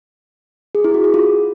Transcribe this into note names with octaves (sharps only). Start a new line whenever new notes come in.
G#4
E4
F#4
G#4
F4